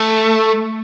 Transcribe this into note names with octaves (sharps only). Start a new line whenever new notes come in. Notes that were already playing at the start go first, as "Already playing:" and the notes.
Already playing: A3